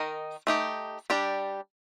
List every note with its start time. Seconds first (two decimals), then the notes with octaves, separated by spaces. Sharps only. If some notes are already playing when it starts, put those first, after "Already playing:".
Already playing: D#3 D#4 A#4 D#5
0.47 A3 D#4 G4
1.10 G3 D4 G4 D5